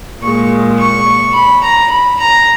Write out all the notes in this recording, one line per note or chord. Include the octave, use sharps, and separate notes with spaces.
A#2 G#3 C#6
C#6
B5
A#5
B5
A#5